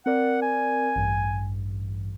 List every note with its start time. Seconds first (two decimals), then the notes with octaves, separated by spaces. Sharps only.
0.06 C4 A#4 D5 F#5
0.42 G#5
0.96 A1 G2